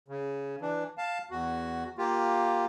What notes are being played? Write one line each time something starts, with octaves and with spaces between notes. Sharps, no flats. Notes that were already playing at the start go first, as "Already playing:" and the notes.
C#3
E3 D4
F5 A5
E2 F#4
A#3 F4 G4